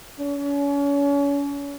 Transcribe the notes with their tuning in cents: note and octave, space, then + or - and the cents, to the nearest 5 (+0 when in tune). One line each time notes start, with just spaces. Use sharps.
C#4 +35